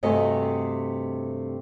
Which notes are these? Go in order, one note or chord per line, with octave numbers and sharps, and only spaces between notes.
G2 C3 A3 F#4 D#5 G#5